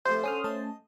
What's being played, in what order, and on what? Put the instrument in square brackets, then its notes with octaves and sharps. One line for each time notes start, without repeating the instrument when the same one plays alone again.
[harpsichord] C3 F3 A3 [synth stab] C5
[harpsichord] D3 [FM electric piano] C#4 D#6 F6
[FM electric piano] A3 C#4 A5 [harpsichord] D#5